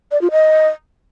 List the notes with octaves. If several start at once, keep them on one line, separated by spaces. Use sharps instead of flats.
D5
F4
D#5